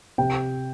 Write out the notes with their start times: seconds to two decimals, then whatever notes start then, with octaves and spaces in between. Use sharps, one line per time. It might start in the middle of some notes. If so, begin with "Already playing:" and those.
0.18 C3 G5